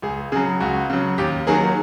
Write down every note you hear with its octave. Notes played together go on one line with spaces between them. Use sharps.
C#2 G#4
C#3 F#3 G#4
C#2 F#4
C#3 F#3
D#2 G4
D#3 F#3 A#3 G#4